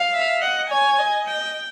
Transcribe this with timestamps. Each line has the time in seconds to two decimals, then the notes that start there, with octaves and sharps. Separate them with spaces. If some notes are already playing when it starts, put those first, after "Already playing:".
Already playing: F5
0.14 E5
0.42 D#5 F#5
0.70 C#5 G#5
0.98 D#5
1.27 G5